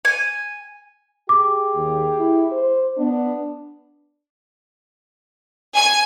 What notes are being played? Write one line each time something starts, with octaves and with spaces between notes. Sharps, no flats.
G#5
G4 G#4 D6
D#2
E4
C5
B3 D4
G#5